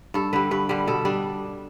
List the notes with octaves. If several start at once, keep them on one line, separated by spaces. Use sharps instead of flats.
G2 A4
D3 G3 B4
G2 B4
D3 G3 B4
B2 A4
G3 D4